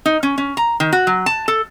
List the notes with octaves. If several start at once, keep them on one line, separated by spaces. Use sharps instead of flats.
D#4
C#4
C#4
A#5
D#3
F#4
F#3
A5
A4